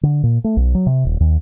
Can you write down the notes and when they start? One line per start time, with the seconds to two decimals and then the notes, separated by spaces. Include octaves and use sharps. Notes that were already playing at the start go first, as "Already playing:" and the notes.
0.03 D3
0.23 A#2
0.44 A3
0.57 B1
0.75 F#3
0.86 C3
1.05 D#1
1.20 D#2